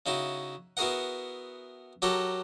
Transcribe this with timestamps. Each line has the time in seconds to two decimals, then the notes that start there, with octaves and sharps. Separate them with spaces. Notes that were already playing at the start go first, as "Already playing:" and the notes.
0.06 C#3 D#4 E4 F#4
0.77 B3 E4 F#4 G#4 A#4 F#5
2.02 F#3 F#4 G4 A4 A#4